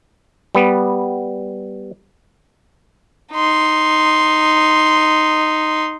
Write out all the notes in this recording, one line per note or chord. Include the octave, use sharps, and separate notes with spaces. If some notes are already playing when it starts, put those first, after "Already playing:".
G3 B3
D#4 C6